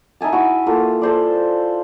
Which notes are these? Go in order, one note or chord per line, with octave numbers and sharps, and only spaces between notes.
D#4 E5 G#5 A5
E4 F#4
A#3 F4 A4
A4 C5 D5